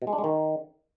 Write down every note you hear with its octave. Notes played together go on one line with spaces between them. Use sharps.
B2
G#3
D4
G#3
D#3